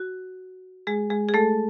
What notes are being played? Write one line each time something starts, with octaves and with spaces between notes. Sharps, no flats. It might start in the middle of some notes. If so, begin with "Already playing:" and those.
Already playing: F#4
G#3 G#4
G#3 G#4
G#4
A3 A4